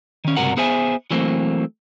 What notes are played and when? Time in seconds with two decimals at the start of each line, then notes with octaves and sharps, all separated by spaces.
0.25 D#3 C#4
0.37 C#2 G2 C3 F#4 A#4 F#5
0.57 B3 G#4 C5 E5 G#5
1.11 E3 F#3 A3 A#3 C4